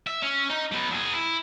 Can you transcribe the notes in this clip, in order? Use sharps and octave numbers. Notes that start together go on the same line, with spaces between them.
E5
C#4
D#4
F#3 B3
F#3 G#4
E4